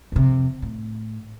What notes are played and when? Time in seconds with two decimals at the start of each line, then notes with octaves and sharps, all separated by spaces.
0.12 F2 C3
0.62 A2